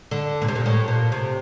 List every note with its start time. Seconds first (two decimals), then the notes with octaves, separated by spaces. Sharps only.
0.11 D3
0.42 A#2
0.48 C3
0.55 A#2
0.66 A2
0.88 A#2
1.12 C3